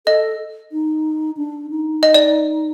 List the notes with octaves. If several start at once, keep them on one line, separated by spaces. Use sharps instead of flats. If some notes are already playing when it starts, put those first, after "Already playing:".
A4 D#5
D#4
D4
D#4
D#5
D5